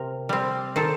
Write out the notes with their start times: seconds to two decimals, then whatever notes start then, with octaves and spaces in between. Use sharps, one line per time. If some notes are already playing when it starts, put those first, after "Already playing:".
Already playing: C3 A#4
0.29 G3 C4
0.76 D#3 A4 C5